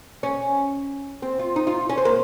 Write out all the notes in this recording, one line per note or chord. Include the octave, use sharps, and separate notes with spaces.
C#4
C4
F4
D#4
F4
C#4
C4
A#3